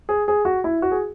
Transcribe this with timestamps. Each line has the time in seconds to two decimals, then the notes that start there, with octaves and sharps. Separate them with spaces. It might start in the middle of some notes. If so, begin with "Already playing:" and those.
0.09 G#4
0.28 G#4
0.45 F#4
0.64 E4
0.82 F#4
0.91 G#4